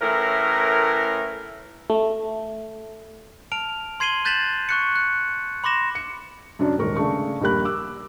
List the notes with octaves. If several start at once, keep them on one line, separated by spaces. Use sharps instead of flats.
A2 E3 C#4 A#4
A3
A5 F6 D7 F7
C6 G#6 C7 D#7 F#7 G7
F#6 G6 A6 B6 E7 F#7
C#6 F#6 C#7
F#6
B5 C6 D6 A#6 E7
C#7
F#2 D3 F#3 C#4 D4
D#1 G#2 A#4 C#6
C#3 A3 D4 G#4 C#6
A#1 D#2 G3 A#4 B5 F#6
D6 E6